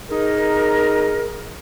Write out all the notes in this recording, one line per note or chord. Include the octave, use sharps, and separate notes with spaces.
D#4 G#4 A#4